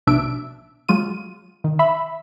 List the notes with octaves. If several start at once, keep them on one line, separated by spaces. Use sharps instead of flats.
A#1 B2 D4 E5 D7
F#3 G#3 F4 D#7
D#3
E5 B5